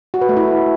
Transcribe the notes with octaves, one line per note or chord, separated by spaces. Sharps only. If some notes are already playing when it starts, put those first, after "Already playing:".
F#4
B4
A3
E4